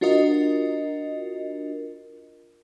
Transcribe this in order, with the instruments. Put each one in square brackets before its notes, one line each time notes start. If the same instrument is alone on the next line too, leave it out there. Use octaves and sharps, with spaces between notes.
[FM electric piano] D4 F4 F#4 A#4 D#5